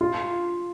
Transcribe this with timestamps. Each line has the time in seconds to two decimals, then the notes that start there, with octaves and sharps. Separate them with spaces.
0.01 F4